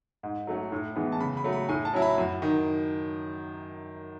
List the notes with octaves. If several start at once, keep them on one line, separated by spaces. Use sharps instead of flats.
G#2
F#3 A3 C#4
A2
E3 G#3 B3
A5
C#3 B5
B5
F#3 A3
B5
A2 G#5
A5
F#3 C#4 E4
B5
F#2
D#3